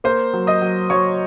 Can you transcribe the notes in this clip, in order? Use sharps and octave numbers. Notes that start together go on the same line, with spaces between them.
A#3 C5 C6
F#3
D#5 D#6
F#3
F#3 C#5 C#6